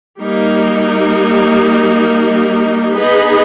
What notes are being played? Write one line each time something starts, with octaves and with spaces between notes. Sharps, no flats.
G3 A#3 D#4
B3 D#4 G#4 B4 D#5